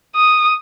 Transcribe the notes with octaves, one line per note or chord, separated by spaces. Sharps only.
D#6